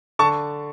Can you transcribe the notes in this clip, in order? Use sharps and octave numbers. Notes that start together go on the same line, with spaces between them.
D3 A5 C#6